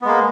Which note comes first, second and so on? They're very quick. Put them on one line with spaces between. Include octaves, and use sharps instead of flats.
B3 G#3 A#3